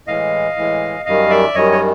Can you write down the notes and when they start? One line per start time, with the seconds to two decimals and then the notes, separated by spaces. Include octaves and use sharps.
0.07 A2 E3 G#3 D#5 F5
0.56 A2 E3 G#3
1.05 F#2 D#3 G3 D#5 F5
1.30 D5 E5
1.54 F#2 D#3 G3 C#5 D#5
1.72 C#5